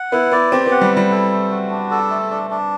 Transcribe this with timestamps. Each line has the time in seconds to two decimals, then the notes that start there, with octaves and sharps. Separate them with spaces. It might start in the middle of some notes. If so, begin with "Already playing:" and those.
Already playing: F#5
0.12 B3 E4
0.32 B3 D5
0.52 C4 G4
0.66 B3
0.71 F#5
0.81 G3
0.92 G3 E4
1.11 A4
1.31 A3
1.51 F#4
1.70 D4
1.91 A4
2.10 A3
2.31 D4
2.50 D4